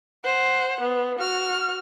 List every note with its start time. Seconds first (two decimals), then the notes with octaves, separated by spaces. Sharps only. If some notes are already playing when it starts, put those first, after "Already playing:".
0.25 C5 F#5
0.81 B3
1.19 F#4 F6